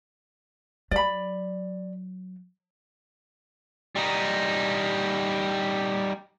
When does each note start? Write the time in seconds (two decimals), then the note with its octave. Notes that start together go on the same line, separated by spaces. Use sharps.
0.91 F#3 D5 B5
3.96 G3 D#4